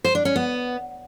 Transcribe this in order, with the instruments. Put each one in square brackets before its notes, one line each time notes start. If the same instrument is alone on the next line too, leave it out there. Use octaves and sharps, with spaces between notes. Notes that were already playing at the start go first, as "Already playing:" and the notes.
[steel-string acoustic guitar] C5
D4
C#4
B3